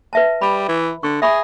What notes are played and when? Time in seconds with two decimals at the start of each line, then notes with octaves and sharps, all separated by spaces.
0.13 B4 E5 A5
0.41 G3 B5
0.68 E3
1.03 D3 C#6
1.22 G#4 E5 B5 C#6